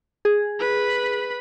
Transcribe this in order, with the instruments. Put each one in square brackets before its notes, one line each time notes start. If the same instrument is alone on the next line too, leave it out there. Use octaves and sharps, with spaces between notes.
[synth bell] G#4
[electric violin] B4 B5